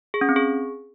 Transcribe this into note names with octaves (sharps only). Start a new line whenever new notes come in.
G#4
C#4
C4
G#4